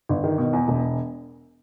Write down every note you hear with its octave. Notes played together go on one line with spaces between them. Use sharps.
G1
D#3
B2
E2
E1